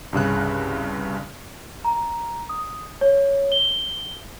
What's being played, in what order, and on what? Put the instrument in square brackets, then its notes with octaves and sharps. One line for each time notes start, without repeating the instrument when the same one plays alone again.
[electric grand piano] C2 G2 C#3 F#6
[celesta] A#5
D#6
C#5
G7